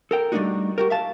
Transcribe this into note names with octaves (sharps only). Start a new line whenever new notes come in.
A4 A#4 G5
G3 A3 C4 D4 D#4 F#4
F#4 G4 A#4
E5 F5 A5